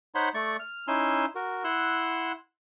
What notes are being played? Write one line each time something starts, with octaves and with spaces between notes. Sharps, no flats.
D#4 C5 C#5 F#5 B5 C6
A3 D5 C#6
F6
C#4 D#4 E4 G#5 C6 E6
F#4 A#4
E4 F#5 C6 E6 F#6